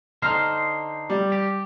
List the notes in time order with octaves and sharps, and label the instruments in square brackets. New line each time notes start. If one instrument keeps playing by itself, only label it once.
[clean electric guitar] D3 D#4 C5 [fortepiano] F6
[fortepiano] G3
[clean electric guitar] G4